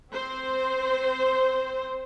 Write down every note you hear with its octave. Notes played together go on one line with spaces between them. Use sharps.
C4 C5